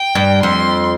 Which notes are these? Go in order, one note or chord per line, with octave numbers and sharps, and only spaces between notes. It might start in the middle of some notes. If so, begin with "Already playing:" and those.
Already playing: G5
G2
F2 C6